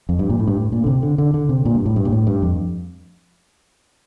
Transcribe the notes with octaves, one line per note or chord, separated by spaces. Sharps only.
F2
G2
A#2
A2
G2
A2
A#2
D3
C3
D3
D3
D3
C3
A#2
G2
A2
G2
A#2
A2
G2
F2